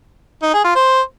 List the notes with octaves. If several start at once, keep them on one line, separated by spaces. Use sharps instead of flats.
D#4
G#4
F4
C5